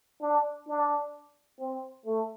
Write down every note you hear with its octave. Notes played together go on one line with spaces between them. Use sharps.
D4
D4
C4
A3